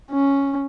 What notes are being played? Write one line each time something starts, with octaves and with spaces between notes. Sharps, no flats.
C#4